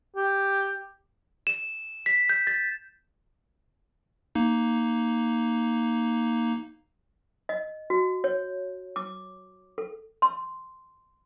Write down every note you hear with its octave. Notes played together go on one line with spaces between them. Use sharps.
G4
E7
B6
G6
A6
A#3 D#4
D#5
F#4
C#5
D6
A4
C6